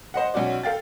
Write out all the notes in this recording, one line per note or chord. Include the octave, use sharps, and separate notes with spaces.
C5 D#5 F#5
B1 C#4 F#4 D5
A4 F5 G5 A6